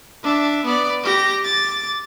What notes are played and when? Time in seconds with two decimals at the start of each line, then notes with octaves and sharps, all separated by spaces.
0.24 D4 E5
0.64 B3 D5
1.03 G4 A#6
1.44 D6 A6